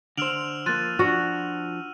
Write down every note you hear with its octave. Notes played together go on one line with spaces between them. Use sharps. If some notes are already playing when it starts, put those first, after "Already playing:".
D3 C5 E6 F6 D7 F7 F#7
F3 A#3 C6 F#6 A6 D#7
F3 D4 F#4